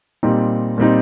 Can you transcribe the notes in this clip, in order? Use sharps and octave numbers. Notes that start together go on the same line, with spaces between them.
A#2 G3 C4 D#4
A#2 G3 C4 D#4